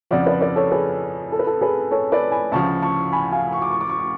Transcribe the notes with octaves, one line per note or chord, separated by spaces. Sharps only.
F2 C#3 F3 D5 F#5
B4 D5
B4 D5
A4 C#5
G#4 B4
A4
B4
A4
G#4 B4
A4 C#5
B4 D5
G#5 B5
D2 C#3 F3 A5 C#6
A5 C#6
G#5 B5
F5 G#5
C#6
D6
C#6
D6
C#6
D6